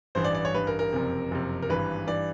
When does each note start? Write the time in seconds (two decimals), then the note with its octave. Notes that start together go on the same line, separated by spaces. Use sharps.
0.15 A1 G2 E3 C5
0.24 D5
0.35 D5
0.45 C#5
0.53 A1 G2 E3 B4
0.67 A#4
0.79 A#4
0.93 F#1 F2 C3
1.31 F#1 F2 C3
1.62 A#4
1.69 G#1 G2 E3 B4
2.07 G2 E3 D5